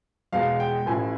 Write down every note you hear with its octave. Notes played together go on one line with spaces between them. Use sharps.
E2 B2 G#3 F5
G5
A1 A2 F3 G#5